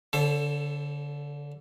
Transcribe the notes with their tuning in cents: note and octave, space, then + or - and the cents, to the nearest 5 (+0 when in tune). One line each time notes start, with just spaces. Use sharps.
D3 -30 A4 +10 C5 +35